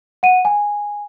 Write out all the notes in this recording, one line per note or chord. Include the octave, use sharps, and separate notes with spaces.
F#5 D#7
G#5